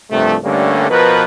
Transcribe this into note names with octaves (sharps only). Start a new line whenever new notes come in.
C2 G2 C3 F3 A3
G2 D3 G3 A3 A#3 C#4
B2 F3 A#4 B4